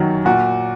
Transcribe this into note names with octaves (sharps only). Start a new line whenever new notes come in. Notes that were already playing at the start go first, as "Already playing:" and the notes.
Already playing: F#2 D#3 F#3
A#2 F#4